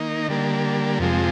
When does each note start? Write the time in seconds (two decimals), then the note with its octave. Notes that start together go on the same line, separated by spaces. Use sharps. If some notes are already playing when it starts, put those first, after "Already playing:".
Already playing: D#3 A#3 D#4
0.28 D3 G3 A#3
0.99 F2 C3 F3 G#3